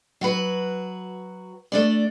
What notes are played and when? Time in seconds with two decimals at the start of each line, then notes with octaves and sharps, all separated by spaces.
0.21 F#3 F#4 B4
1.72 A3 D4 D5